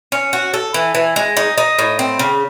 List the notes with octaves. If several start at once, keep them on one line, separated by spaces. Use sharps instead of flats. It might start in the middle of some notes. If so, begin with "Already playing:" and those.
C#4
F#4
A4
E3
E3
G#3
D#4
D#4
A2
C4
C#3